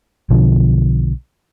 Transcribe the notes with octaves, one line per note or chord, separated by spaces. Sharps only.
B1 B2 D3 F3